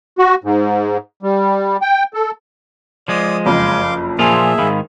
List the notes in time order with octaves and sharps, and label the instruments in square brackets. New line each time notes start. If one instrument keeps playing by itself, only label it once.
[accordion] F#4
G#2
G3
G5
A4
[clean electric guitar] F3 G#3 [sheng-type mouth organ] D5 D#6
[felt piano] F#1 F2 [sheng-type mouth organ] F5 C6 D6
[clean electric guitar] A#2 F3 F4 [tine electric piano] A#3 G#5 A5 [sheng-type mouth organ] G#4 E5
[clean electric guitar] G#2 D#3 [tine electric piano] F5 B5